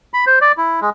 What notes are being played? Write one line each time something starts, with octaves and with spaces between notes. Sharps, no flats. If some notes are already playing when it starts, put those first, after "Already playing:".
B5
C5
D5
E4
G#3